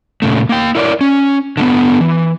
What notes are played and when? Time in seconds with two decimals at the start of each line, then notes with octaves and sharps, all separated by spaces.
0.22 A#2 C#3 A3
0.49 A#3 G5
0.75 E4 A#4 C#5 D5
1.01 C#4
1.57 D3 A3 B3
2.01 E3